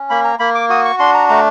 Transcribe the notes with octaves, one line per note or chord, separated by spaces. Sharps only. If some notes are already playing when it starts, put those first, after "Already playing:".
Already playing: C#4
A#3 B5
A#5
A#3 B5
D6
F#4 D#6
C#6
D4 C6
A#5
A3 A#5